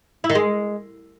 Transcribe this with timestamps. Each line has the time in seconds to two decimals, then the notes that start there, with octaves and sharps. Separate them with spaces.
0.24 E4
0.30 D#3
0.35 G#3